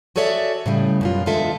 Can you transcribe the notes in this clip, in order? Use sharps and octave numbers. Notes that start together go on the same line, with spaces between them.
F#4 G#4 A4 C#5 D5 E5
A2 C#3 G3
F#2 B2 F4
E2 D3 G#3 F4 A4 E5